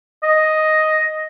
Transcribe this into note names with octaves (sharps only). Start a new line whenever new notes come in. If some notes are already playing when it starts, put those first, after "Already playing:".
D#5